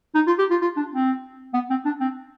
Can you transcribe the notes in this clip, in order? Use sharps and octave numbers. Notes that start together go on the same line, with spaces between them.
D#4
F4
G4
F4
F4
D4
C4
B3
C4
D4
C4